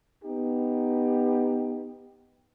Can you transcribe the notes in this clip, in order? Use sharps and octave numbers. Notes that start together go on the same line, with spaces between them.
B3 D#4 G4